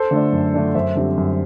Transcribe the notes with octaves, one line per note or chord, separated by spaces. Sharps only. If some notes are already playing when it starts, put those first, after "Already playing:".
Already playing: A4 C5
D3 A3 D4
F#2
D3 A3 D4
F#2 C5 E5
D3 G3 C4
F#2